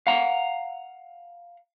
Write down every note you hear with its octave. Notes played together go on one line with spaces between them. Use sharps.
F5 F#5 A#5